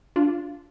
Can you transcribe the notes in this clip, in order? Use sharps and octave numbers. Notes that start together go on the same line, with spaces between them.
D4 F4